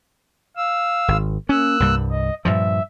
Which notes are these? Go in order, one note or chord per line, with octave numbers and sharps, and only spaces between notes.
F5 E6
G#1
A#3 C#4 E6 F#6
C2 G2 G3
D#5
G2 A#2 F3 E5